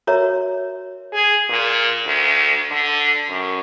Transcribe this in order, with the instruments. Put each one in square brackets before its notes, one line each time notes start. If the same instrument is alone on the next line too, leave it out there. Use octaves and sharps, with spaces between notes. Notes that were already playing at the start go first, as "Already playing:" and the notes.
[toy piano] F#4 A#4 C#5 E5 A#5
[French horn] G#4
A#2
D2
D3
F#2